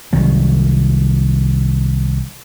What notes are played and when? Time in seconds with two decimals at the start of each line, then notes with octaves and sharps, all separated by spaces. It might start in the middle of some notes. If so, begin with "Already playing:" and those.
0.13 C2 D#3 F#3